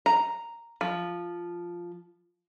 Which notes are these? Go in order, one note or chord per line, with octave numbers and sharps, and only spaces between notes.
A#5
F3